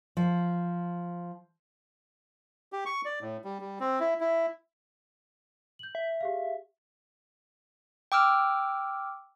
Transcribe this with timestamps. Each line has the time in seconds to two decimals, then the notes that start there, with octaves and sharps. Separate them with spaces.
0.17 F3
2.73 G4
2.85 C#6
3.05 D5
3.21 A2
3.44 G3
3.61 G3
3.80 C4
4.00 E4
4.20 E4
5.79 G6 F#7
5.95 E5
6.21 G4 G#4 F5
8.12 G5 D6 E6 F6